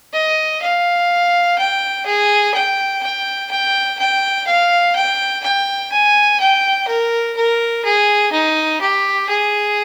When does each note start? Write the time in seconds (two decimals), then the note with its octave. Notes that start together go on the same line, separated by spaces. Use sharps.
0.13 D#5
0.61 F5
1.58 G5
2.06 G#4
2.54 G5
3.02 G5
3.51 G5
3.98 G5
4.47 F5
4.95 G5
5.43 G5
5.91 G#5
6.40 G5
6.87 A#4
7.36 A#4
7.84 G#4
8.32 D#4
8.80 G4
9.29 G#4